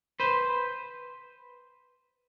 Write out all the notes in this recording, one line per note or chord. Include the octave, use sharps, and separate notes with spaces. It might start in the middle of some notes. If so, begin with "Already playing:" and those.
B4 C5